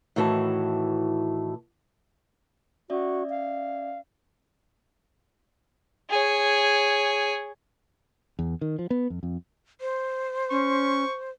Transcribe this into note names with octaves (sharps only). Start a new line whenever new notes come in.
A2 D#3 E3 F#4 G5 A5
C#4 F#4 D5 E5
F5
G#4 C#5
E2
D#3
F3
B3
F2
F2
C5
C#4 C#6